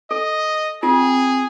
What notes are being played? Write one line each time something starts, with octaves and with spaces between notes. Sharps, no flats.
A4 D#5
C4 F4 G#4